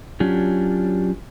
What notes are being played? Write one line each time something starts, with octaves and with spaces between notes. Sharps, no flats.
F#3 C#4 D4 F4 G4